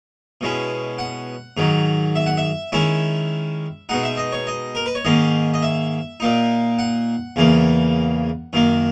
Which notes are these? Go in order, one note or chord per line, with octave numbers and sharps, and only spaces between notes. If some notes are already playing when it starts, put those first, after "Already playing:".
B2 G#3 C#4 E4
F#5
G#2 D#3 F#3
E5
F#5
E5
D#3 G#3 C#4 E4 E5
B2 G#3 D#4 F#5
E5
D#5
C#5
D#5
A#4
B4
C#5
G#2 D#3 A#3 C#4 D#5
D#5
E5
A#2 A#3 D#4
F#5
E2 C#3 E3 A#3
F#2 D#3 A#3